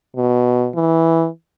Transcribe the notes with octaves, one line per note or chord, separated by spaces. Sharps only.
B2
E3